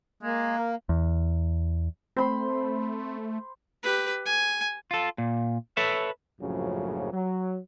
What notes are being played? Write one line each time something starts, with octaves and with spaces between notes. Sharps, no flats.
G#3 A#3
A#4
E2
A3 C4 C5 B5 C6
G4 B4
G#5
F4 A4
A#2
A4 B4 C#5 E5
A#1 F#2 A2 C#3 F3 F#3
F#3